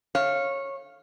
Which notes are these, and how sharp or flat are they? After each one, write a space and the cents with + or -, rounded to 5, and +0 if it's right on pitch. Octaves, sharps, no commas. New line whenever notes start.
C#5 -15 F5 +0